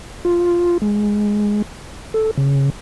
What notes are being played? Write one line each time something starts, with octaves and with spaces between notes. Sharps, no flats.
F4
G#3
A4
C#3